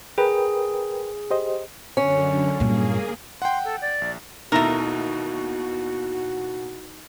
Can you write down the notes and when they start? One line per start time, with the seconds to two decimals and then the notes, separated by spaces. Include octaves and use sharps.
0.18 G#4 A#4 B4 G5
1.30 G4 C5 D#5
1.97 F#2 D3 C#4
2.60 G2 A#2 A#3 G#4
3.42 F#5 G5 C6
3.64 A4
3.82 D5
4.02 A#1
4.52 D#2 B2 A3 D#4 E4 F#4 A#4